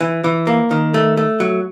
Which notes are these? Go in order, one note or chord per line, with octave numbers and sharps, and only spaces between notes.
E3
E3
A#3
D#3
A3
A3
F#3